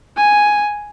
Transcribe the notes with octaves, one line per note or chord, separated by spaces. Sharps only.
G#5